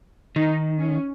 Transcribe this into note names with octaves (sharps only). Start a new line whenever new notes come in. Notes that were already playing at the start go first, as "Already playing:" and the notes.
D#3 D#4
C#4